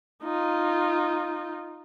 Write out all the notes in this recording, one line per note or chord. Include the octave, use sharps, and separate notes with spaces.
D#4 F4